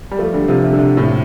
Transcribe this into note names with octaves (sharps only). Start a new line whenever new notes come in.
G3
F3 A3
D3 G3
C3 F3
C3
D3
C3
A2 D3